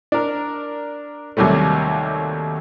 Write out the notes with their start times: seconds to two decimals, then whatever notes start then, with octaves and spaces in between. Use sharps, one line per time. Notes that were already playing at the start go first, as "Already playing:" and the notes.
0.12 D4 A#4
1.37 D#2 C3 F#3 G3 A3